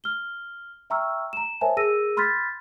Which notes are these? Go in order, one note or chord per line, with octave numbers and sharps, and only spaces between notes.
F6 G7
E5 G5 A#5 C#6 E6 F6
A#5 E7
A#4 C5 C#5 E5 G#5 A5
G#4 A#4 E6 A#6 D#7
B5 C6 F6 G6 A6 B6